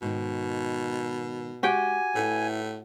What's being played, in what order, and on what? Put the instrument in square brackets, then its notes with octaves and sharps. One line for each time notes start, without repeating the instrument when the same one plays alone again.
[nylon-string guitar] G#2 D#3 [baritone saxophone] B2
[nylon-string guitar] G#3 [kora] F#4 G4 G5 [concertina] G#5
[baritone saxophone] A2 [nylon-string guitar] E4 A4 B4